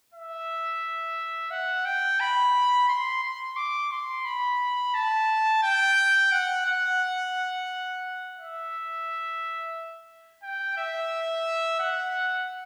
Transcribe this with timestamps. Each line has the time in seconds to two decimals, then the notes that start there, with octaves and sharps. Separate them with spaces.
0.14 E5
1.51 F#5
1.86 G5
2.20 B5
2.89 C6
3.23 C6
3.57 D6
3.92 C6
4.25 B5
4.95 A5
5.63 G5
6.32 F#5
6.65 F#5
8.38 E5
10.43 G5
10.78 E5
11.80 F#5